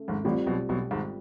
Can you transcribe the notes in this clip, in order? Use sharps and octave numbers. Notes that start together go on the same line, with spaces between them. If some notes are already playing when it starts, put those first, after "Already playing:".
Already playing: C#3 A3
G#1 G#2
A1 A2 G3 C4 F4
B1 B2
B1 B2
G#1 G#2